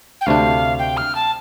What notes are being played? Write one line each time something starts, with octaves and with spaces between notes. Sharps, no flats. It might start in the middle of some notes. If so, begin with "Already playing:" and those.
G5
D2 C3 A3 D4 F5
G5
F6
A5